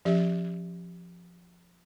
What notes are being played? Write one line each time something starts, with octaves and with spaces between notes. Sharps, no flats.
F3 C#4 G4 E5